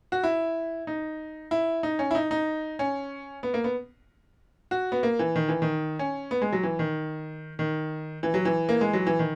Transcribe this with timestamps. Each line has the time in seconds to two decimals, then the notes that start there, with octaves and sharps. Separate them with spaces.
0.12 F#4
0.24 E4
0.87 D#4
1.51 E4
1.83 D#4
1.99 C#4
2.11 E4
2.15 D#4
2.31 D#4
2.79 C#4
3.43 B3
3.54 A#3
3.64 B3
4.71 F#4
4.92 B3
5.03 A#3
5.19 E3
5.36 D#3
5.48 E3
5.62 D#3
5.99 C#4
6.31 B3
6.42 G#3
6.53 F#3
6.63 E3
6.79 D#3
7.59 D#3
8.23 E3
8.34 F#3
8.45 E3
8.69 A#3
8.81 G#3
8.93 F#3
9.07 E3
9.19 D#3